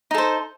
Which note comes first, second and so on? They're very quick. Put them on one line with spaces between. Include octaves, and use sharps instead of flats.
D#4 A4 C5